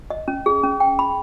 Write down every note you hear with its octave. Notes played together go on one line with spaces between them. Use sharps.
D#5
C#4
G#4
C#4
G5
B5